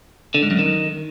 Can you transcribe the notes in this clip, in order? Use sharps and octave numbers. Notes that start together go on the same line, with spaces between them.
D3
G#2
F#2
D#3